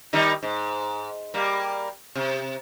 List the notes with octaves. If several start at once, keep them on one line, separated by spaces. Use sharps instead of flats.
D#3 G3 D#4
G#2
G3 A#3
C3